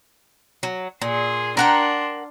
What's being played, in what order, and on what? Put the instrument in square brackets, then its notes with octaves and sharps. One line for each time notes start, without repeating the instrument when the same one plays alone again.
[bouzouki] F#3
[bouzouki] A#2 [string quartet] G#4 C6
[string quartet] D4 C6 [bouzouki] A#4 F#5 G5